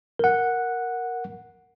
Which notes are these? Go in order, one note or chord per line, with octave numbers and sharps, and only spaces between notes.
A#4 F#5